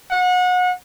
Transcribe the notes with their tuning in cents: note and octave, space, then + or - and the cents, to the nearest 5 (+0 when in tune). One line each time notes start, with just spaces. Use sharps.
F#5 -30